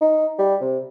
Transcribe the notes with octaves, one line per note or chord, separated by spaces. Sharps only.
D#4
G3
C3